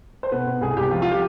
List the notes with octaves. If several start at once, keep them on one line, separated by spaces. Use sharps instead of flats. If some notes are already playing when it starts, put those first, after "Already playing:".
C5
B2 B4
B2
C2 G#4
C2 G4
F3 F4
F4
G4